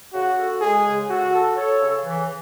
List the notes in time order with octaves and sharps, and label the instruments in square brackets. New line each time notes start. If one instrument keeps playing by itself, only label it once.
[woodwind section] C#3 [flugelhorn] F#4
[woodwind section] A4
[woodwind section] G#3 [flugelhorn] G#4
[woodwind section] C#3
[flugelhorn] F#4 [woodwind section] A4
[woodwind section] A4
[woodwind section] A4 [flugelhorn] C#5
[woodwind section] C#3
E3